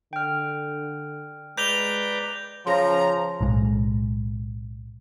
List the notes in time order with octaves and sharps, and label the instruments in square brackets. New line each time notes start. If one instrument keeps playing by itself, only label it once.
[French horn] D3 [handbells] G5 F6
[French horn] G#3 [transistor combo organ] B4 D5 A#5 [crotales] G6 F7 G7
[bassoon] C#3 [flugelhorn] F3 [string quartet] A#5 [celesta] C6 A#6
[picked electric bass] B1 A2 G#3